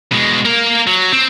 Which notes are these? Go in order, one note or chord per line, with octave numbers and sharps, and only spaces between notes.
B2 G#3
A#3 A#4
F#3
C4